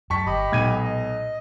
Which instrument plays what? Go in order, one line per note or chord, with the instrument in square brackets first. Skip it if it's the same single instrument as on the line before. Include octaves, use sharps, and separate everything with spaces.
[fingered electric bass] F#2 [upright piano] A5 C#6 B6
[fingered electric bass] G1 [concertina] G4 D#5 B5
[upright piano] B1 G#6 D#7 [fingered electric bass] A#2 G#3
[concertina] D#5